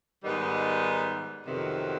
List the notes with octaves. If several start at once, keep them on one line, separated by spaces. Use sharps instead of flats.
G#2 D#3 G3 B3 D#4
F2 C3 D#3 F#3 B3